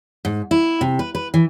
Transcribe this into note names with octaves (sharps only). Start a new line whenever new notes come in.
G#2
E4
C3
B4
B4
E3